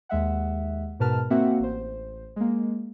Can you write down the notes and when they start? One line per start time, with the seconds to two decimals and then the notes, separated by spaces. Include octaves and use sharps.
0.09 D#2 G#3 E5 F#5
1.00 G#2 B2 A#4 B4 A5 F6
1.30 A#3 C4 F#4 E5 F#5
1.60 A1 C5
2.36 G#3 A#3